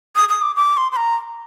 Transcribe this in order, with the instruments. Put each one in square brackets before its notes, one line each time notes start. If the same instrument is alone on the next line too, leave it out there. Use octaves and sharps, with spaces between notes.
[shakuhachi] D#6
D#6
D6
D6
C6
C6
A#5